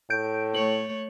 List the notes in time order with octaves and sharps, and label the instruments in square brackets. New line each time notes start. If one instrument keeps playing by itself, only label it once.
[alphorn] A2 [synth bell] G6 D7
[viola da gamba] A3 C#5 [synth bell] F#7